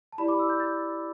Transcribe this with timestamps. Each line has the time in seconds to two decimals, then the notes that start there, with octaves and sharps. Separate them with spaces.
0.12 A5
0.18 E4 G4 D5 B5
0.28 D6
0.39 E6
0.49 G6
0.60 A6